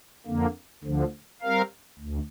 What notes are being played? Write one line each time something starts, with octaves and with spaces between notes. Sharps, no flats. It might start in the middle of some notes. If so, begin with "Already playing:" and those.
F2 D3 A#3
D2 D3 F3
G3 C4 A#4 F5
D2